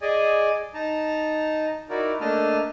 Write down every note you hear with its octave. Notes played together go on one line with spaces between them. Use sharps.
G#4 D5 D#5 G#5
D#4 A5 A#5
D#4 E4 F#4 A#4 D5
A3 A#3 D4 D#5 A5 F6